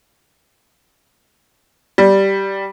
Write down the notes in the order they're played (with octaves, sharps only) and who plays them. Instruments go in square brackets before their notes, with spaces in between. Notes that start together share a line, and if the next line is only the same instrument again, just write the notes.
[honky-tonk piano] G3